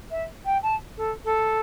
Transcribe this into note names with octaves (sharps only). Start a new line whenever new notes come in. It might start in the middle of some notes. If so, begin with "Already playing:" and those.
E5
G5
A5
A4
A4